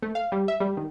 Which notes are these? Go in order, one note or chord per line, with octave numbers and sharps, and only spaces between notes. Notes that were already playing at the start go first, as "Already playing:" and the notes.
A3
F5
G3
E5
G3
D#3